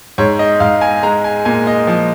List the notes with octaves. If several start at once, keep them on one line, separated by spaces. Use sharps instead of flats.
G#2 C#5
D#5
G#2 F5
G#5
G#3 A#5
G#5
A#2 G#5
D#5
F3